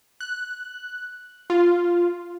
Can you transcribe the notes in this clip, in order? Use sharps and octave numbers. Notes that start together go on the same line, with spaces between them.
F#6
F4